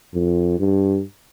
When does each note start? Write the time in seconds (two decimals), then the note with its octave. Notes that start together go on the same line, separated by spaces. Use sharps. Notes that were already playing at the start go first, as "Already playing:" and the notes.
0.14 F2
0.59 G2